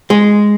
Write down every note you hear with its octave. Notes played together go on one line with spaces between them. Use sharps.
G#3